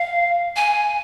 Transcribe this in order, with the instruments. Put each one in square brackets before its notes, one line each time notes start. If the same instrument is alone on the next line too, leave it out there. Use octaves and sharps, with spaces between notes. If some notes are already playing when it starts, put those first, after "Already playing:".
Already playing: [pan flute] F5
G#5